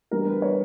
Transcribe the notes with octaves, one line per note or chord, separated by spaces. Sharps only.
E3 G3 B3 D4 A#4
B4
C#5